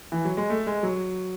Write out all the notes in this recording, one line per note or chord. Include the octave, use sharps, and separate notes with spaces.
E3
F#3
G#3
A3
G#3
F#3